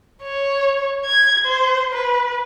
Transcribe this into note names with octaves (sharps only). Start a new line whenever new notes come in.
C#5
G#6
C5
B4